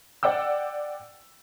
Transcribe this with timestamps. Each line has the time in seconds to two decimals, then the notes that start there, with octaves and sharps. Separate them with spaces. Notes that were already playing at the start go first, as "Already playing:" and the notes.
0.23 D5 F#5 G5 E6